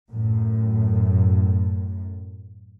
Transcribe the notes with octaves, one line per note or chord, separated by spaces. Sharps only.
F#2 A2